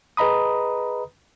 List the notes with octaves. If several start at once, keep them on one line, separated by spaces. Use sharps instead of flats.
G#4 B4 D#5 A#5 B5 D#6